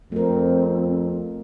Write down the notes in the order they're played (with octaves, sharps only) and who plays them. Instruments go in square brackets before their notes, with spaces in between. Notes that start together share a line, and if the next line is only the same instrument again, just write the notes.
[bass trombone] F2 [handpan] A3 A#4 [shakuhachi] C4